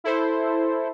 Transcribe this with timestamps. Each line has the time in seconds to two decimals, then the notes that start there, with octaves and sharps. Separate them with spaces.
0.04 E4 A4 C5